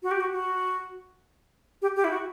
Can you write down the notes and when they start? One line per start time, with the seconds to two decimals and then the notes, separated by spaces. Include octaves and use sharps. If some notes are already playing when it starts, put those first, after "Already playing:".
0.03 F#4
0.11 G4
0.20 F#4
0.32 F#4
1.82 G4
1.96 G4
2.04 E4
2.11 F#4